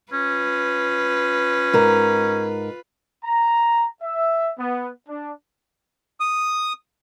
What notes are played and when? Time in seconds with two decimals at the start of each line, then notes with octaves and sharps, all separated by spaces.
0.12 C#4 F4 B4
1.73 G#2 A#4
3.24 A#5
4.02 E5
4.58 B3
5.08 D4
6.20 D#6